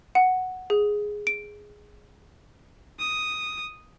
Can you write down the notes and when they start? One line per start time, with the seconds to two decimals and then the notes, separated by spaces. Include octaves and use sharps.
0.15 F#5
0.70 G#4
1.27 D7
2.99 D#6